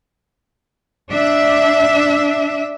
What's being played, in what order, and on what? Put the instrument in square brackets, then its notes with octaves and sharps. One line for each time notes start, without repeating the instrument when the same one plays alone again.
[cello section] D4 E5